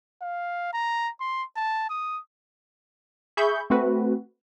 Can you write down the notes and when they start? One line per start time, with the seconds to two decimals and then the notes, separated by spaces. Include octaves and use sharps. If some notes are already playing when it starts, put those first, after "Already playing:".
0.22 F5
0.73 A#5
1.20 C6
1.56 A5
1.89 D#6
3.37 G#4 E5 B5 C#6 G6
3.70 A3 C4 F#4 B4